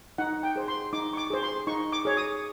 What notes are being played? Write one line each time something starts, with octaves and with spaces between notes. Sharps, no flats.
D#4 F#5
G5
G#4 C5
C6
D#4 D6
C#6
D6
G#4 C5
C6
D#4 C#6
D6
G#4 C#5
D#6